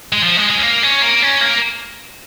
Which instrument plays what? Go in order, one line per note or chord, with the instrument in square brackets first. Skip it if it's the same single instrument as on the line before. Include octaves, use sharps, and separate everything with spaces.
[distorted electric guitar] G#3
F3
G#3
G#3
C#4
A#3
C#4
A#3
C#4
A#3